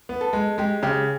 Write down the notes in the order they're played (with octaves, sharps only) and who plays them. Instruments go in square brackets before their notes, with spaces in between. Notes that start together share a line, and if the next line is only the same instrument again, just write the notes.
[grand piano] B3
[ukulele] A4
[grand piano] G#3
[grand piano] G#3 [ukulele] G4
[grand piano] C#3 [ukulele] G4